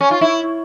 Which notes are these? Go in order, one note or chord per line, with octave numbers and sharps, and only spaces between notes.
C#4
F4
E4